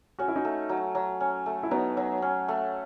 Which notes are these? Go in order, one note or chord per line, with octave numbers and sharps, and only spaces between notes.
C#4 F#4
E4
D#4 F#4
A3
F#3
F#3
C#4
A3
E4
F#3 B3 D#4
F#3
C#4
A3